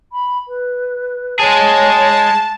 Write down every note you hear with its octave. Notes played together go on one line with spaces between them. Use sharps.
B5
B4
G#3 G#4 C#5 A5